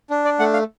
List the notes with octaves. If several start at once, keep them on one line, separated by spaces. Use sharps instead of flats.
D4
D5
A3 F#5
F5